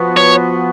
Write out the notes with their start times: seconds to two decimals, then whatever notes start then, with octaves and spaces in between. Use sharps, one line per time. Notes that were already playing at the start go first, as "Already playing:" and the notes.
Already playing: F3 B3 F#4
0.17 C#5